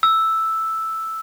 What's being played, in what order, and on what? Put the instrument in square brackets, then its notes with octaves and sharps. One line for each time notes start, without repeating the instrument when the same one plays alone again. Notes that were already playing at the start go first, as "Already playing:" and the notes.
[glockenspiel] E6